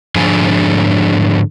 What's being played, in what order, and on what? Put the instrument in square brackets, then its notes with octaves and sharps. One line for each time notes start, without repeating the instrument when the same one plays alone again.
[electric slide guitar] G#2 D3 F3 D4 G#4 G#5